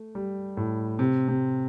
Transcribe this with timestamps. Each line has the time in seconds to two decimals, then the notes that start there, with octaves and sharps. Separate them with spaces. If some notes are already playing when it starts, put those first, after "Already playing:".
Already playing: A3
0.15 G3
0.57 A2
0.99 C3
1.28 C3